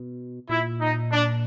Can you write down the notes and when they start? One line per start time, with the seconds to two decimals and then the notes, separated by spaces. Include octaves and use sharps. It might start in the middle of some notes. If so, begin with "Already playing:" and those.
Already playing: B2
0.49 A#2 E4
0.81 D#4
1.12 D4